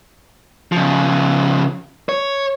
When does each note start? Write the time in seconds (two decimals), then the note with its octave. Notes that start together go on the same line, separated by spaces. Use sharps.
0.72 C#3 F3
2.09 C#5